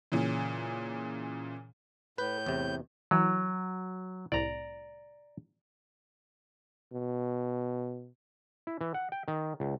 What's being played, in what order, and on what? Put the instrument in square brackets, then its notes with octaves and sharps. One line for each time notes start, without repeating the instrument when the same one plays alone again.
[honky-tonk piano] A#2 C#3 E3
[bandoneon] A2 G6 [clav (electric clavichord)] B4
[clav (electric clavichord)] E2 C3
[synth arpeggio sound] E3 [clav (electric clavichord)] F#3
[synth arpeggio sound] C2 A2 [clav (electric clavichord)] D5 A#5
[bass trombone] B2
[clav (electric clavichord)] E4
E3
F#5
G5
D#3
C#2